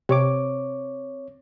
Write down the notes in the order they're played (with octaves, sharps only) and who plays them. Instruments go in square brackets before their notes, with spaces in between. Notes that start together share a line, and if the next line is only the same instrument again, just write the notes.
[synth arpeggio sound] C3 [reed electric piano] C4 C#5 D6